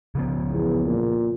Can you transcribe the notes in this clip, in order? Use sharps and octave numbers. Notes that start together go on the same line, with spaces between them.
C#3 F3 B3
E2
A#2